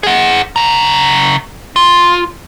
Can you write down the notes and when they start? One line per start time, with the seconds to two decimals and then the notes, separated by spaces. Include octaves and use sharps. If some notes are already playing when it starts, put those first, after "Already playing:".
0.03 G#4 F#5
0.56 C#3 A#5
1.76 F4